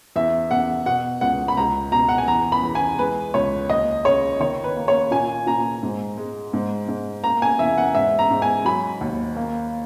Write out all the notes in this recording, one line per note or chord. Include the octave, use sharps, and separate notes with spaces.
E2 E5
E2 F#5
B2 F#5
C#2 F#5
B5
C#2 A#5
B2 A#5
F#5
G#5
E2 A#5
B5
E2
G#5
G#3 B4
C#2 C#5
D#2 D#5
C#3 C#5
D#3 C#5
B4
A#3
C#5
A#2 G#5
A#2 A#5
G#2
G#3
G#2
G#2
A#3 A#5
G#5
E2 E5
F#5
G#2 E5
A#5
G#2
G#5
F#3 B5
D#2
A#3